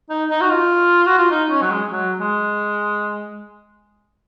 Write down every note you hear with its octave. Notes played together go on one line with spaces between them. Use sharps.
D#4
D#4
F#4
F4
F#4
F4
D#4
C#4
F#3
G#3
F#3
G#3